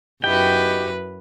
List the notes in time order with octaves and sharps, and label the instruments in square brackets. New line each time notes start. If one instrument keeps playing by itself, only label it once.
[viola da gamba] F#2 B4 [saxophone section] B3 D#4 G4 [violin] E4 F#4 [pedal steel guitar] G5